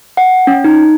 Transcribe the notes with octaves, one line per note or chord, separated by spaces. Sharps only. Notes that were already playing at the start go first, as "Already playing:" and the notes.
F#5
C#4
D#4